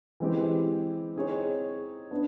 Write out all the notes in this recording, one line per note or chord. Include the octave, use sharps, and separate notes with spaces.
E3 G#3 C4 E4 G4
C4 D#4 G#4 C#5
B3 D4